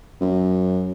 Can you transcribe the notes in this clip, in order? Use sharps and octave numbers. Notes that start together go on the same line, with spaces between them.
F#2